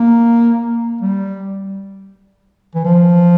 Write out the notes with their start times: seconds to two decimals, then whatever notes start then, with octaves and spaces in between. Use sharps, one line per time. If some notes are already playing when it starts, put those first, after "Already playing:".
Already playing: A#3
1.01 G3
2.75 E3
2.85 F3